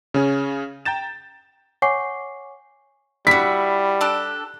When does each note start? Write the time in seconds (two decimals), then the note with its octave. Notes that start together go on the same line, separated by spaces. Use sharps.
0.14 C#3 C#4 G#4
0.85 G5 A#5 G6 A6 E7
1.82 C#5 F#5 G#5 C#6 D6 C7
3.27 G3 E4 F#4 B6
4.01 D4 G4 A4